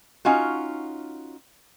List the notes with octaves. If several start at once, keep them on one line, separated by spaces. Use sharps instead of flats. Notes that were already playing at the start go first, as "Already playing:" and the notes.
C#4 D#4 F4 F#4